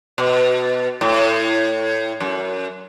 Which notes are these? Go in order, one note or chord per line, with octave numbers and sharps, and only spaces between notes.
B2
A2
F#2